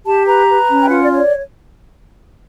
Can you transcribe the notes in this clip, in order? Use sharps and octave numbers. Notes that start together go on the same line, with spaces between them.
G4 A5
B4 A#5
B4
C#4
G5
F4 F#5
D5
C#5
D5